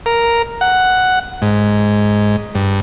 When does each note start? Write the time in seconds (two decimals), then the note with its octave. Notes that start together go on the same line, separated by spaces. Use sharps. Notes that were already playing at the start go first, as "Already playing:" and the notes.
0.06 A#4
0.61 F#5
1.42 G#2
2.55 G2